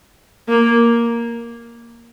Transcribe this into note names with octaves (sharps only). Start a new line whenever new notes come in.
A#3